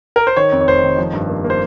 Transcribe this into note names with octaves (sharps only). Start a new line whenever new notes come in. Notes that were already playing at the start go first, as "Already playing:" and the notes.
A#4
C5
D#3 C#5
F2
C#5
F1 C5
D#3
F3
G2
A#3
A#3
C5